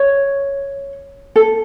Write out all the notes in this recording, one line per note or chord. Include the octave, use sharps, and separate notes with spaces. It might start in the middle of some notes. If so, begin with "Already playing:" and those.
Already playing: C#5
A4